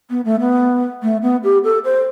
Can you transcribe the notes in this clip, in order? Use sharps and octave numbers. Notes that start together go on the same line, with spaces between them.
B3
A3
B3
A3
B3
G4
A4
C5